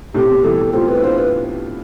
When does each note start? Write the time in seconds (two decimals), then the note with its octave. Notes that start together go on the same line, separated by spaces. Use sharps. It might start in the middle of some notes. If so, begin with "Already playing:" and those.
0.14 A2 C3 G4
0.30 B2
0.44 E3 G3 A4
0.73 A3 C4 F4
0.88 B4
0.99 E4
1.03 D4 F4 C5
1.18 B4